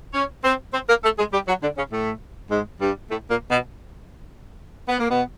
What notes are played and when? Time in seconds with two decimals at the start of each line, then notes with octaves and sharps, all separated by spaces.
0.14 C#4 C#5
0.44 C4 C5
0.73 C4 C5
0.89 A#3 A#4
1.04 A3 A4
1.18 G#3 G#4
1.33 G3 G4
1.48 F#3 F#4
1.62 D3 D4
1.77 C#3 C#4
1.92 A2 A3
2.51 G#2 G#3
2.81 G2 G3
3.11 A2 A3
3.30 A#2 A#3
3.50 B2 B3
4.88 B3
5.00 A#3
5.10 B2 B3